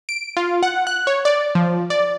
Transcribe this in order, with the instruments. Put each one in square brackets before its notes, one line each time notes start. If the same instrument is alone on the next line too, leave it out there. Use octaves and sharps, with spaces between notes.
[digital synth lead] D7
F4
F#5
F#6
C#5
D5
F3
D5